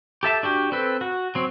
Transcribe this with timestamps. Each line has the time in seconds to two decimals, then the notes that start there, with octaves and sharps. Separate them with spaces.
0.23 G4 A4 E5 A5
0.43 D4 F#4 G4
0.72 C4 A4 B4
1.01 F#4
1.35 F#3 C4